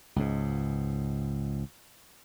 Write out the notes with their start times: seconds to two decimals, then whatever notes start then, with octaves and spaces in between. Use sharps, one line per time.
0.16 C#2 G#2